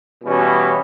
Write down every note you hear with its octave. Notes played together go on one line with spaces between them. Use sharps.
B2 E3 G3 C#4